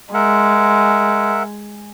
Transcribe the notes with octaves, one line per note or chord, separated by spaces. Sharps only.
G#3 A#4 E5 F#5